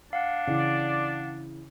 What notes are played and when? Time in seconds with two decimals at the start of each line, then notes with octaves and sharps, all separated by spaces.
0.13 D4 F5 F#5
0.47 C#3 E3 D5